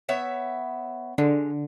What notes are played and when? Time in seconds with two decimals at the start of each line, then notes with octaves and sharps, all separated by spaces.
0.09 B3 C#5 E5
1.18 D3 G#3